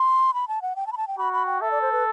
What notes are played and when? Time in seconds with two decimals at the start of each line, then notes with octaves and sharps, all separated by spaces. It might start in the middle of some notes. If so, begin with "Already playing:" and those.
Already playing: C6
0.34 B5
0.48 A5
0.62 F#5
0.76 G5
0.87 A5
0.92 B5
0.97 A5
1.08 G5
1.18 F#4 B5
1.33 B5
1.46 G5
1.61 A4 E5
1.71 D5
1.82 C5
1.92 B4